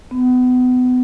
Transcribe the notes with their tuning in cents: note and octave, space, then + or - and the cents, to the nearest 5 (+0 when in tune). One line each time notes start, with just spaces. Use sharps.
B3 +30